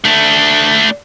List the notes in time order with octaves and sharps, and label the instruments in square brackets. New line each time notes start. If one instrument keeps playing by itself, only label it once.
[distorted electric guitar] A3 D4